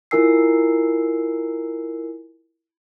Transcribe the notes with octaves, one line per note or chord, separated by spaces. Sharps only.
E4 F4 A#4 G#5 E6 C7